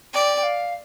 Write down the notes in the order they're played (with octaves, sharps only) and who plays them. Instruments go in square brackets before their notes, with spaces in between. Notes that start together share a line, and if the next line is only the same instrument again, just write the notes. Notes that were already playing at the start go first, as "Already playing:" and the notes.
[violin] D5 [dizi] G5
[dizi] G5
F5